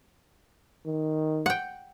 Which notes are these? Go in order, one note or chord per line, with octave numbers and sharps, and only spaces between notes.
D#3
F#5 G5